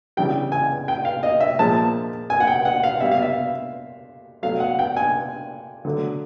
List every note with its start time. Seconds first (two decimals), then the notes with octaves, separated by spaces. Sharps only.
0.17 C#3 E3 G3 G5
0.52 G#5
0.88 G5
1.05 F5
1.23 D#5
1.40 E5
1.59 A#2 F3 G#3 A5
2.30 G#5
2.40 F#5
2.47 G5
2.65 F#5
2.84 F5
3.00 B2 G3 E5
3.12 F5
3.22 E5
4.43 B2 F#3 A3 F5
4.60 F#5
4.79 G5
4.96 G#5
5.85 D3 F#3 A3